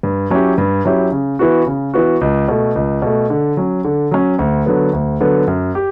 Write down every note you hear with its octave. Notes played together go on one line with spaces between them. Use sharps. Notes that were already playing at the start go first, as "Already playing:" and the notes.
G2
F#3 C#4 E4 G4
G2
F#3 C#4 E4 G4
C#3
E3 B3 F#4
C#3
E3 B3 F#4
C#2
B2 A3
C#2
B2 A3
D3
F#3 C#4
D3
F#3 C#4
D2
D3 F#3 B3
D2
D3 F#3 B3
F#2
G4